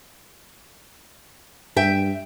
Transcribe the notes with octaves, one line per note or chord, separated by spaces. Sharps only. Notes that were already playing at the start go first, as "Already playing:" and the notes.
G2 E5 G5